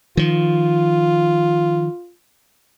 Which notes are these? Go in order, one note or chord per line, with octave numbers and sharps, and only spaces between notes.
D#3 F3 F4